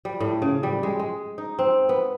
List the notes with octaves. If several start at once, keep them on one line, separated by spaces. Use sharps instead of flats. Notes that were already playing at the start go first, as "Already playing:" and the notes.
G3
A2
C#3
G3
G#3
G#3
D#4
C4
B3